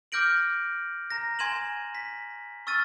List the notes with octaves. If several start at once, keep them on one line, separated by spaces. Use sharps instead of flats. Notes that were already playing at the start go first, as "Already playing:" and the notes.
D6 F6 G6 A#6 D7 F#7
A#5 A#6
G#5 C6 G#6 D#7 E7 F#7
B6
C#6 E6 F6 A6 D#7